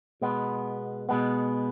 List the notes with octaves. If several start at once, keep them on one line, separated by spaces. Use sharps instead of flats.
B2 G#3 B3
B2 G#3 B3